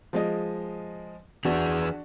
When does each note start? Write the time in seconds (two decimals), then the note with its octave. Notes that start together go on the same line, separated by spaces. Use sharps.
0.13 F3 G#3 D#5
1.45 E3 D4 F#4 G#4 B4